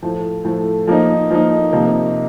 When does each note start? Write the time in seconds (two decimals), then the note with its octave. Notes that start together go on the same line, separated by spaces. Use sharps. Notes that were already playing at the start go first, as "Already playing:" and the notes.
0.02 A2 F3 A3
0.45 A2 F3 A3
0.87 F3 A#3 D#4
1.31 F3 A#3 D#4
1.72 C3 F3 A#3 D#4